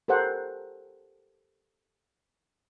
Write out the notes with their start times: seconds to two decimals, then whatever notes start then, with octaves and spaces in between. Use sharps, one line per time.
0.08 G4 A4 A#4 C5 F#5